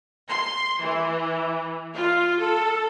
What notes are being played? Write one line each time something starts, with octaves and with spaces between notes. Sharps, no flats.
C6
E3
F4
A4